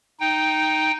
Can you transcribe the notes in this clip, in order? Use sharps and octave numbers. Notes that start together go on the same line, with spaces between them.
D#4 G5